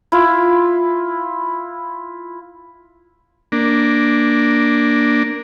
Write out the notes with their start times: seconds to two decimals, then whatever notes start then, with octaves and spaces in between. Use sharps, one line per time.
0.12 E4 F4
3.52 A#3 D4